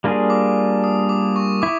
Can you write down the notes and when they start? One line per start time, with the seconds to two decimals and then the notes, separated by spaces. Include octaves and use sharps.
0.04 G3 A#3 D4 F4 G#4
0.30 D6
0.84 D#6
1.09 D6
1.36 C#6
1.62 E4 D6